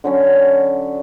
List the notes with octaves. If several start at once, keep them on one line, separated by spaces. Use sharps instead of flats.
D3 F#3 C#4